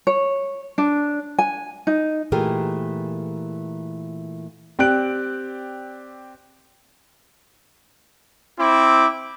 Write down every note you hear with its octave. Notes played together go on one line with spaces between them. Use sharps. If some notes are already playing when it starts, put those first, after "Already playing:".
C#5
D4
G#5
D#4
A#2 E3 A3 G4 G#4 A#4
C4 G4 D5 F#6 D7
C4 E4 D6